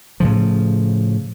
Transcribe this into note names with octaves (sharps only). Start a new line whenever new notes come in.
A2 C#3 F3